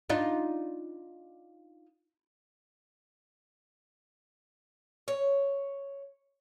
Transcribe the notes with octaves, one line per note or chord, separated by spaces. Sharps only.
D4 D#4 F4
C#5